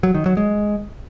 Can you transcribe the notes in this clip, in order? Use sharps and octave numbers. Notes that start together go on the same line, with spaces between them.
F#3
D#3
F#3
G#3